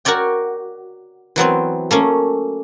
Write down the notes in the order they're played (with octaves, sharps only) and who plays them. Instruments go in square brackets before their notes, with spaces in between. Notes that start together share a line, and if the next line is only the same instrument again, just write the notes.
[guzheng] F#4 A#4 C#5 D5 G5
E3 F#3 B3 C4
A3 A#3 C#4